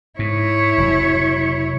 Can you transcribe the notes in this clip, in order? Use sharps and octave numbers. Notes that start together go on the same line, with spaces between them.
G#2 E4 C#5
F1 F#3